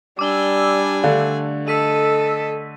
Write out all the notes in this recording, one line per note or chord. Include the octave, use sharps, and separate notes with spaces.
G3 D4 G#5 D6 E6 G7
D3 A3 F5
A4 D#5 E6 B6 D#7